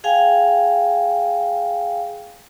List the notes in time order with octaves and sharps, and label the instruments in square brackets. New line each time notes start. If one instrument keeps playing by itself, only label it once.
[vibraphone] G#4 F5 G5 G#5